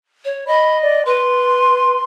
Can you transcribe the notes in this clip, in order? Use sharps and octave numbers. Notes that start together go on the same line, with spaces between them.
C#5
D#5 B5
D5
B4 C6